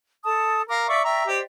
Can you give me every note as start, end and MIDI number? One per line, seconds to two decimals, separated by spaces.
0.25 0.61 69
0.25 0.61 81
0.25 0.61 87
0.69 0.85 70
0.69 0.99 77
0.69 0.99 86
0.89 1.02 74
0.89 1.02 76
0.89 1.02 85
1.05 1.23 74
1.05 1.26 76
1.05 1.23 79
1.05 1.26 82
1.05 1.23 85
1.27 1.39 67
1.27 1.43 72
1.27 1.43 74
1.27 1.43 75